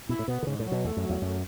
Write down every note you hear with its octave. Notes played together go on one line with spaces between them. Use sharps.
B2 E4
A2
B2 B3
D3
G#2 C#3
A2
F#3
B2
E2 A3
F#2
F#3
E2
F#2 A3